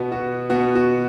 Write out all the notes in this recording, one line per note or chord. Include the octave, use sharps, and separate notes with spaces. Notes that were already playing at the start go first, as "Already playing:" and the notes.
Already playing: B2 B3 F#4
F#4
B2 B3 F#4
F#4